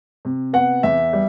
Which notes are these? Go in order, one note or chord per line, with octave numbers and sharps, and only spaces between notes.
C3
B3 F#5
E2 E5
G3